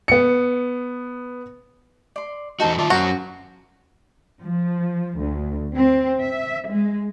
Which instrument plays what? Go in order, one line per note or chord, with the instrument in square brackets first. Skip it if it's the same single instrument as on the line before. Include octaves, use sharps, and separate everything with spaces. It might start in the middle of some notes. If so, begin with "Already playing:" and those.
[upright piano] B3 C#7
[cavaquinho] D5 C6
[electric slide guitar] E2 F#4 [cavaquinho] D#4 A4 C5
[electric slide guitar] D#3 F4 [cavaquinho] D5 E5 A5
[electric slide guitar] F#2 C#4 [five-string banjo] F#4 [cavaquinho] A#4 C5
[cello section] F3
D2
C4
E5
G#3